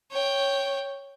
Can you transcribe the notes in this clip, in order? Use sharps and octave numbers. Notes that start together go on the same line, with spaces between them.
C#5 G5